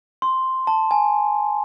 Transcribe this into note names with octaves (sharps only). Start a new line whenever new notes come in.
C6
A5
G#5